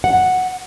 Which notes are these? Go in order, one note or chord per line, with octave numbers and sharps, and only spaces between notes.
F#5